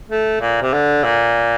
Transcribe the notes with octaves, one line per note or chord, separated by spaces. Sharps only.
A3
A#2
C3
D3
A#2